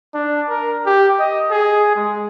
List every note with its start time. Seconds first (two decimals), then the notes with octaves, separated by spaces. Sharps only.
0.14 D4
0.49 A#4
0.86 G4
1.19 D#5
1.51 G#4
1.96 G#3